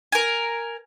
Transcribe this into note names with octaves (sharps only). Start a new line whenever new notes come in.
A#4 G#5